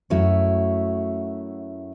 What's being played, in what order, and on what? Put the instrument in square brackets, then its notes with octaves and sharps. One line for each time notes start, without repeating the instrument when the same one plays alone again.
[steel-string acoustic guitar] F#2 A3 E4 F#4 C#5